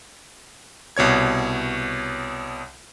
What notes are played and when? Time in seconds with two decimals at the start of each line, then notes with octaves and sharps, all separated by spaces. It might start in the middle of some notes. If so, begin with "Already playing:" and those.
0.97 C2 B2 C#5 G#6